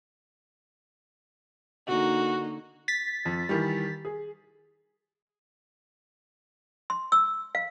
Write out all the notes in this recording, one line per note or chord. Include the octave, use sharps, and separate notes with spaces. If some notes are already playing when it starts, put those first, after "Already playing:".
D3 A#3 D#4 F#4
A6 B6
F2
D#3 E3 G3
G#4
C6
E6
F5